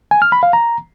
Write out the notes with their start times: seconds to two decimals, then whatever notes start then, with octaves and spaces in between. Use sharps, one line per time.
0.11 G#5
0.22 F6
0.32 B5
0.43 F5
0.53 A#5